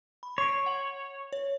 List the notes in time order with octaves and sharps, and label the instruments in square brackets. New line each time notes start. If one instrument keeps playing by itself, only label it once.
[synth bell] B5
[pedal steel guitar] C#5 [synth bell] C6 C7 D7
[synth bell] F#5 F#7
C#5